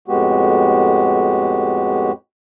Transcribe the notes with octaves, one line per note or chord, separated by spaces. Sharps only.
F2 A2 G#3 B3 F#4 G4